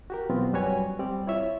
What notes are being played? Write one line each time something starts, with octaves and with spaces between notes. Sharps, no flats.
F#4 G4 A#4
B2 E3 F#3 B3 C4 F4
F#2 G3 F#4 B4 C#5 G#5
G3 C4 D5
E4 F4 C#5 E5